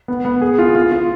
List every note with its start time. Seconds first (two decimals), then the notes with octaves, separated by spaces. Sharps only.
0.08 B3
0.25 B3
0.41 G#4
0.59 F4
0.75 F4
0.92 F4